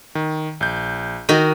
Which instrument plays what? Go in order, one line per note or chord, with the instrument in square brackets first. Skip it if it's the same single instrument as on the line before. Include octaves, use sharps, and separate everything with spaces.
[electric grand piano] D#3
A#1 G6
[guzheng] D#3 F#4 [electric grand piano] D#7